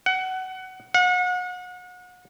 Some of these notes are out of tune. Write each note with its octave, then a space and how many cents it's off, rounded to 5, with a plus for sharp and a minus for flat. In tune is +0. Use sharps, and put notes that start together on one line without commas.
F#5 +20
F#5 -35